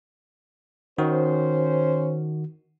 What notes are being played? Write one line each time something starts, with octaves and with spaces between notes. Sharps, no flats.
D#3 C#4 F#4 C5